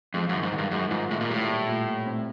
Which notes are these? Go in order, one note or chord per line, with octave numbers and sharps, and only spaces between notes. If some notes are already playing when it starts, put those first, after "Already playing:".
F2 G#3
F#2 D#3
G#2
D#3
G2
F#2 G#3
G#2 F4
A2 G#3
A#2
A2 G3
A#2
A#2
A#2
C4